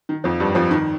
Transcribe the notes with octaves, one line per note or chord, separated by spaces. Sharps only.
D#3
F2 F3
G2 G3
F2 F3
D#3